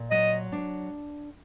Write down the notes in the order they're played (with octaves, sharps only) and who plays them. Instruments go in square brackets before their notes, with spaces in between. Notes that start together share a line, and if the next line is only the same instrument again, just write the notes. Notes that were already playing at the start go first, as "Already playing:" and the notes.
Already playing: [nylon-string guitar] A#2
[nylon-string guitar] F#3 [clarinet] D#5
[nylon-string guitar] D4